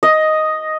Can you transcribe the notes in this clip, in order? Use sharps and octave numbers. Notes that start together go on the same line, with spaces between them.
D#5